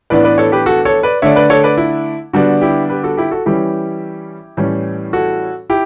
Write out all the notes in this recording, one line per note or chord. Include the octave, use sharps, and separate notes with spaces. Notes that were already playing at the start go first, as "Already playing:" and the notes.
A2 E3 B3 D4 B4 D5
B4 D5
A4 C#5
G4 B4
F#4 A4
A4 C#5
B4 D5
D3 A3 D4 C#5 E5
B4 D5
A4 C#5
B4 D5
E4
D3 G3 B3 D4 F#4
E4 G4
G4 B4
F#4 A4
E4 G4
F#4 A4
E3 G3 C#4 E4 G4
A2 E3 G3 C#4
F#4 A4
E4 G4